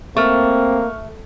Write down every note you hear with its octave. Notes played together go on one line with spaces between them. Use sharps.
A3 A#3 C4 C#6 F6